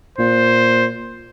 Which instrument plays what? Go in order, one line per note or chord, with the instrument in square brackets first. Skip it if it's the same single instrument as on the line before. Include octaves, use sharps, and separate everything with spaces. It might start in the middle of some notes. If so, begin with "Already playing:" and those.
[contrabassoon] A#2 [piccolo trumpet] C5